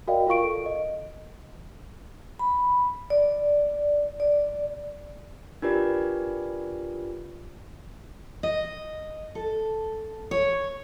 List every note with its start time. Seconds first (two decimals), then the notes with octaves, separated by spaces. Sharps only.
0.07 F#4 A#4 D5 D#5 F5 G5
0.27 F4 A#4 F5 C#6 D7
0.43 A4
0.66 D#5
2.39 B5
3.10 D5
4.20 D5
5.62 D4 F4 G4 A#4 B4 D5
8.43 D#5
9.35 A4
10.31 C#5